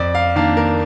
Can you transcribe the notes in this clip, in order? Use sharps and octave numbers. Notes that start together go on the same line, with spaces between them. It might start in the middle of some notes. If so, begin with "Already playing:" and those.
Already playing: F2 D5
F5
D#3 A#3 D4 F5
A#4